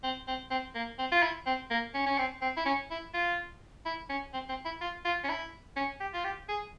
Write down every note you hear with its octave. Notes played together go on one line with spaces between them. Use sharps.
C4
C4
C4
A#3
C4
F4
E4
C4
A#3
C#4
C#4
C4
C4
E4
C#4
E4
F4
E4
C#4
C4
C4
E4
F4
F4
C#4
E4
C#4
G4
F4
G4
G#4